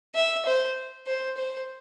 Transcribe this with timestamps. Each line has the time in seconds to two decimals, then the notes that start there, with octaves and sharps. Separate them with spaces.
0.15 E5
0.45 C5
1.07 C5
1.37 C5